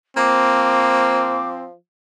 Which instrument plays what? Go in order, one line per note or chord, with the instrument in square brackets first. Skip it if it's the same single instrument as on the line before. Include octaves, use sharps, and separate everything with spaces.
[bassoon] F3 [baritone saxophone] A#3 [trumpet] C4 [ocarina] D6